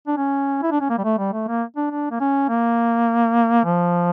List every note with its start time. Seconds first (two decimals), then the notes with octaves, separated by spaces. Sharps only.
0.08 D4
0.17 C#4
0.63 E4
0.71 D4
0.81 C#4
0.90 A#3
0.98 G3
1.04 A3
1.19 G3
1.33 A3
1.48 A#3
1.77 D4
1.91 D4
2.11 A#3
2.20 C#4
2.49 A#3
3.64 F3